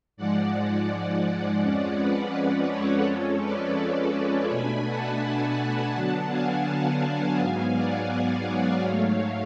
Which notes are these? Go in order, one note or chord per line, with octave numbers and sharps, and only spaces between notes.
G#2 F3 G#3 D5 F#5
D5 F#5
F2 F3 G#3 C#4
B4 D5
A4 C#5
F2 F3 G#3 C#4
B4 D5
A4 C#5
B2 A3 D4 G#5 B5
F#5 A5
D3 F#3 B3 D4
F5 G#5
G#2 F#3 B3
D5 F#5
C#5 F5
G#2 F#3 A3 C#5 F5